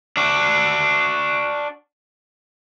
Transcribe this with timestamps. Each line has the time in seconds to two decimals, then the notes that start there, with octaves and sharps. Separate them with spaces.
0.17 D4 F#4